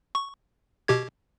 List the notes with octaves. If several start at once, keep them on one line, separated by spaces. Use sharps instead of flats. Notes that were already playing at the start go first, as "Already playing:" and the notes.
C#6
B2 G4 G#6